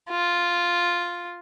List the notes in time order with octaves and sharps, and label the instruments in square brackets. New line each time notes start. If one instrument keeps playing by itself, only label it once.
[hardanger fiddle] F4